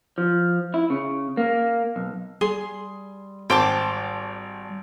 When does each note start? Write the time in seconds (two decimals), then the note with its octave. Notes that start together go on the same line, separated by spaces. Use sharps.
0.18 F3
0.74 E4
0.90 C#3
1.37 A#3
1.96 B1
2.41 G3 G#4 C6
3.50 G#1 C5 G5 A5 D6